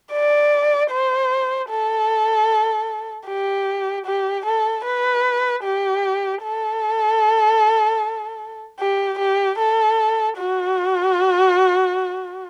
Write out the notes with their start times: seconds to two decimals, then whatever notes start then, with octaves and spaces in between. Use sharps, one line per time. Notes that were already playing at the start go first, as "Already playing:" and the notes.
0.13 D5
0.91 C5
1.69 A4
3.28 G4
4.06 G4
4.46 A4
4.85 B4
5.64 G4
6.43 A4
8.80 G4
9.19 G4
9.59 A4
10.38 F#4